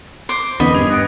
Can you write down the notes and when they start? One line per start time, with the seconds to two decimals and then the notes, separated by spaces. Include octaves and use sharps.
0.29 C5 D6
0.60 E2 D#3 B3 C#4 D#5 B5
0.75 G2 G#4 F7
0.90 B3 A#6 D7